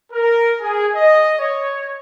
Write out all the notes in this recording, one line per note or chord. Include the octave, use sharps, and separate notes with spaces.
A#4
G#4
D#5
C#5